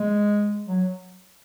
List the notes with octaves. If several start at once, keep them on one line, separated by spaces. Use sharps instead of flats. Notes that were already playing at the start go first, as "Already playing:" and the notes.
Already playing: G#3
F#3